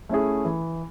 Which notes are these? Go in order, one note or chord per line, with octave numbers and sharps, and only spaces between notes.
A3 C#4 E4 G#4
E3